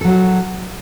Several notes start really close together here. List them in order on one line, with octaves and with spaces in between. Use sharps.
A4 F#3 F#4